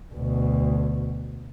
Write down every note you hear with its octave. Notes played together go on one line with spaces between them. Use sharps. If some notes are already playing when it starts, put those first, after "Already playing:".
D2 B2